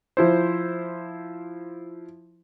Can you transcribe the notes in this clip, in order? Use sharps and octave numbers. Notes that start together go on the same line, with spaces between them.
F3 E4 C5